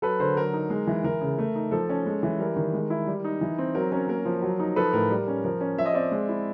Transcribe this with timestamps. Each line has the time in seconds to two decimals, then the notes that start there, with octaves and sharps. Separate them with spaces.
0.02 F#3 A4 B4
0.20 D3 A#4 C5
0.36 F#3 A#4
0.54 D#4
0.70 G#3
0.87 E3
1.04 E3 A#4
1.21 C#3
1.38 A3
1.55 D#4
1.71 F3 A4
1.89 C#4
2.06 G#3
2.23 E3
2.39 G3 A#4
2.56 D#3
2.73 G#3
2.90 E4
3.07 G3
3.24 D#4
3.41 E3
3.58 C4
3.75 F#3 A#4
3.92 C#4 A#4
4.08 A#3 A#4
4.25 F3
4.42 F#3
4.59 D#4
4.76 F3 A4 B4
4.93 A2 A#4
5.10 G3
5.28 C#4
5.44 F3 A#4
5.61 C#4
5.78 F3 E5
5.86 D#5
5.93 C4 D5 E5
6.12 G#3
6.29 E4